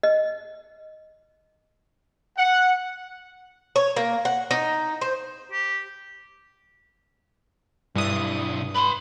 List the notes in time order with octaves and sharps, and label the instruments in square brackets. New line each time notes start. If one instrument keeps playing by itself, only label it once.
[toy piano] D#5
[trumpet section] F#5
[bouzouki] C#5
A#3
F#5
D#4
C5
[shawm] G4
[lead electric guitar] B1 E4 [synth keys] G2 D#6
[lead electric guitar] B4 C6 [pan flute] B5